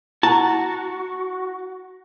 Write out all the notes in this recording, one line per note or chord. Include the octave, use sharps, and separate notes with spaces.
E4 F#4 A5 A#5